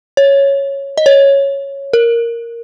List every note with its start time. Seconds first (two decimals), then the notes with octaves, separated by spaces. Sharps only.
0.17 C#5
0.98 D#5
1.06 C#5
1.93 A#4